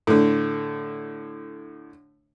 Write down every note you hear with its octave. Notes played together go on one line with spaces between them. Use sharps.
A2 D3